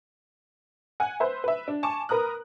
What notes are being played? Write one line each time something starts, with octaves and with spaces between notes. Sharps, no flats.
F#5 G#5 F#6
B4 C5 E5
B4 E5
D4
G#5 A5 C#6 D6
A#4 B4 A#5 D#6 F#6